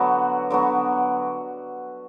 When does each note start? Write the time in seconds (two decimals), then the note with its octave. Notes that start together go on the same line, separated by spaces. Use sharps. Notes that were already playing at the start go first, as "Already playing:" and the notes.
Already playing: D3 F#3 B3 F#4
0.50 D3 F#3 B3 F#4